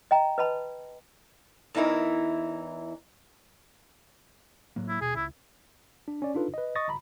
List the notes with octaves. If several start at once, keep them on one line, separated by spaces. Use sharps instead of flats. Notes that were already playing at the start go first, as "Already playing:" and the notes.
D#5 G5 A#5
B4 D#5 A5 B5
E2 E3 D#4 E4 A#4
A2 F#3 A#3
E4
D#1 B2 G#4
C#2 E4
D4
C#4 D5
D4 D#4 F4 A4 B4
B4 D#5
D#5 C#6 D#6 A6 A#6
G1 A#5 B5